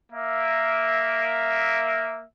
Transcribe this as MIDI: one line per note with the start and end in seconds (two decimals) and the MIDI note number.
0.12 2.25 58
0.12 2.25 76